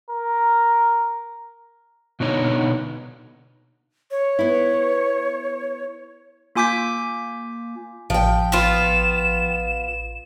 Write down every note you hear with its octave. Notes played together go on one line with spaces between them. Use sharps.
A#4
B2 D3 B3 D#4 C#5
C#5
B3 E4
A#3 F4 G#5 D6 G6 B6
A1 F3 G5
B3 F4 E7